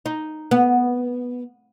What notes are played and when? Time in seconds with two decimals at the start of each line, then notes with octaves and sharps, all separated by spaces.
0.06 D#4
0.51 B3